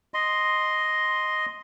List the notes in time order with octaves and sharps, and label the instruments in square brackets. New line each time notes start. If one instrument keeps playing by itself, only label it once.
[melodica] D#5 C6